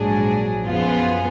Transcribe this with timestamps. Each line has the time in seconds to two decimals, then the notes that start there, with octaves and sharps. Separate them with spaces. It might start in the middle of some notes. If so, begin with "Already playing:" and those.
Already playing: A#1 G#2 F#3 D4 G#4
0.65 F#2 F3 B3 F4 G#4